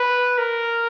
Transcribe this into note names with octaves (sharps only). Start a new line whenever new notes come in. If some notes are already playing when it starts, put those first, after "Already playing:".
Already playing: B4
A#4